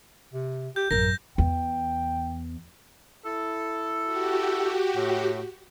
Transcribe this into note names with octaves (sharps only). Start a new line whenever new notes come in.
C3
G4 G6
A1 F#2 A#4 G6 A#6
E2 G5
E4 A4
F#4 G4
A2